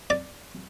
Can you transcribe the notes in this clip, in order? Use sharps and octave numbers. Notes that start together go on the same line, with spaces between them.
D5